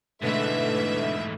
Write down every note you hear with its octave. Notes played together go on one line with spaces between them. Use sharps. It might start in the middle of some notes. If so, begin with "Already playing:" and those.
G#2 B2 D3 E3 G#3 A3 B4 E5